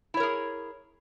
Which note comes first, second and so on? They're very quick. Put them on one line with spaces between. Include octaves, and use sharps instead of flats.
E4 C#5 A#4 G#4